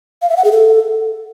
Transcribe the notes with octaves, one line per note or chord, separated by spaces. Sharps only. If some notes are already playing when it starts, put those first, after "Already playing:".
F5
E5
F#5
G#4
A4